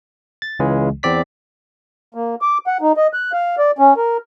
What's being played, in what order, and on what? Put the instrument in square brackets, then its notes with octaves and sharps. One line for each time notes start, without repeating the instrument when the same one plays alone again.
[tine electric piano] A6
C#2 C#3 E3 G#3
E2 C4 D5 B6
[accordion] A#3
D6
F#5
D#4
D#5
F#6
F5
D5
C#4
A#4